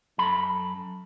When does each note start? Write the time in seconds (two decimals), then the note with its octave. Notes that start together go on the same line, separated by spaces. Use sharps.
0.18 F#2 A4 B5